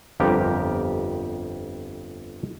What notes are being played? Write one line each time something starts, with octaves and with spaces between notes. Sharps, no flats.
G1 F2 B3 G4 A#4